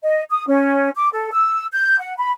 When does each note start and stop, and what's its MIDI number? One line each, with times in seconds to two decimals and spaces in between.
0.03 0.22 75
0.30 0.44 87
0.47 0.90 61
0.95 1.09 86
1.13 1.29 69
1.32 1.66 88
1.73 1.98 91
2.00 2.14 78
2.17 2.31 83